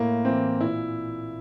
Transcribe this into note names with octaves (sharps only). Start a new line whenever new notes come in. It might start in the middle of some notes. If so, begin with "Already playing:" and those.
Already playing: A2 A#3
E3 C4
A#2 E4